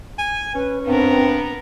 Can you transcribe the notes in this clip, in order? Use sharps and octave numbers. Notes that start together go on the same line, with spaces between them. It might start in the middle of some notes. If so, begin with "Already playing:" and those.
G#5
C#4 B4
G2 B3 C4 A#4